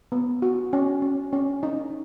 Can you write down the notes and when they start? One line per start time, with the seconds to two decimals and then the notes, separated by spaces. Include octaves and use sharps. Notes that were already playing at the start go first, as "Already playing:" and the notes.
0.12 B3
0.42 F#4
0.73 C#4
1.02 C#4
1.33 C#4
1.63 D#4